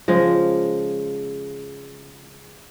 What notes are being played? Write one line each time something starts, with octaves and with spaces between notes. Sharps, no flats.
C#3 F3 G#3